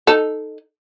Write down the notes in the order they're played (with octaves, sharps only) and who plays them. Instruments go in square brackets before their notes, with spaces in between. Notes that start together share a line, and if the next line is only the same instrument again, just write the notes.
[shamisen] D#4 A4